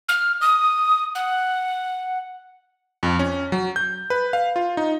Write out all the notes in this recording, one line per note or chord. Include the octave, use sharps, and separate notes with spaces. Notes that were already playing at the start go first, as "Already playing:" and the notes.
F6
D#6
F#5
F2
C#4
F#3
G6
B4
F5
F4
D#4